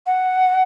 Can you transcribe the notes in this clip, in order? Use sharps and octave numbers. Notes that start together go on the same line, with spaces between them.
F#5